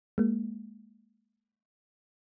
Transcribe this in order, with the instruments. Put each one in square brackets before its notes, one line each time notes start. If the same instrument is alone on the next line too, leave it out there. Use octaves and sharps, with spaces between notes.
[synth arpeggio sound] G#3 A#3